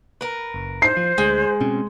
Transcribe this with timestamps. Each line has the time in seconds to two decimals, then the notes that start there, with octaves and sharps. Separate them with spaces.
0.21 A#4 B4
0.54 F#1
0.82 C5 C7
0.97 F3
1.18 D2 G#3
1.60 B2 C4 C#4